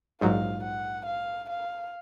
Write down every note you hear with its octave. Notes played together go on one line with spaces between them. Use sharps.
A#1 G#2 F#3 F5
F#5
F5
F5